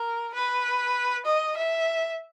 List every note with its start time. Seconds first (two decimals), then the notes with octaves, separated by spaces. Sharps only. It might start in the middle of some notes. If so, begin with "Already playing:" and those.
Already playing: A#4
0.34 B4
1.26 D#5
1.57 E5